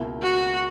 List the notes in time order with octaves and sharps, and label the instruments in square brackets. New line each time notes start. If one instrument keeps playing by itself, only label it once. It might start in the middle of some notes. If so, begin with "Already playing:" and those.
Already playing: [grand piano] C#2 B2 A#3 E4
[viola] F#4